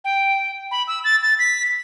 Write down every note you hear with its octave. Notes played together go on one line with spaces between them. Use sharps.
G5
B5
E6
A6
A6
B6